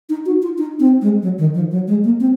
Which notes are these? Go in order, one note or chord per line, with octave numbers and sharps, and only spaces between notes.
D#4
F#4
F4
D#4
C4
G#3
F#3
D#3
F3
F#3
G#3
A#3
C4